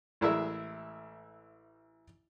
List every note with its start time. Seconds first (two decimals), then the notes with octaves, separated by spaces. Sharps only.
0.21 A1 G#3 E4 G#4 A#4 E5